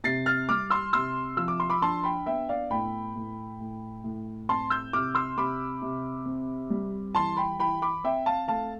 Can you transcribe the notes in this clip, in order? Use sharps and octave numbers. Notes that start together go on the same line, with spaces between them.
C3 A6 C7
F6 A6
G3 D6 F6
C6 E6
C3 C6 E6
F3 E6
D6
C6
B5 D6
D4 A5 C6
G5 B5
B3 E5 G5
D5 F5
A2 G5 B5
A2
A2
A2
C4 A5 C6
E6 G6
C3 D6 F6
C6 E6
C3 B5 D6
C3
C4
G3
E3 A5 C6
G5 B5
E3 G5 B5
B5 D6
C4 E5 G5
F5 A5
A3 F5 A5